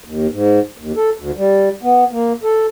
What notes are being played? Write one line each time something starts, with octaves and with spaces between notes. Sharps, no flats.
D#2
G#2
D#2
A4
D2
G3
B3
A#3
A4